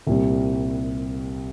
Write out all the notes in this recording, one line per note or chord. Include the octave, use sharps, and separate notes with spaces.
C2 A#2 G3 C4